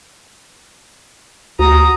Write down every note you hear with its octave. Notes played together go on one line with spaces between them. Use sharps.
D2 F#4 A#5 D#6